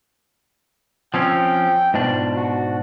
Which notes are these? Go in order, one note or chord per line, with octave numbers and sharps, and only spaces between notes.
F3 C4 C#4 G5
G#2 B2 D4 F4
F#4